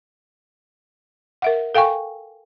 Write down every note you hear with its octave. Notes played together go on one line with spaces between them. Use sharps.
A#4 E5 F#5
A4 F5 G5 G#5 C#6